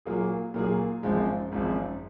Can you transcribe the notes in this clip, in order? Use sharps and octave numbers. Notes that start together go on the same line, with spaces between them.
A#2 F#3 A#3 F4 G#4
A#2 F#3 A#3 F4 G#4
G#1 F#2 F3 G#3
G#1 F#2 F3 G#3